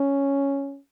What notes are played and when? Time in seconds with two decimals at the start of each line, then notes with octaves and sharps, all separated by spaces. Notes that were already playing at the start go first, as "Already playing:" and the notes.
Already playing: C#4